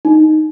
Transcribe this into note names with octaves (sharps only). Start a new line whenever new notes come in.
D#4